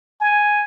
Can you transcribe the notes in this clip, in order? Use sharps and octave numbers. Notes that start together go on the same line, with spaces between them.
G#5